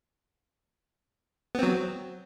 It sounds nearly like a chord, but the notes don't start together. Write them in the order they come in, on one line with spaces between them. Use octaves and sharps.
B3 C4 F#3